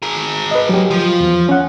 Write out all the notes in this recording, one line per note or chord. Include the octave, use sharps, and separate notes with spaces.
G#4 A#4
B4 D#5
F#3 G4
F3
E2
C#4 F#5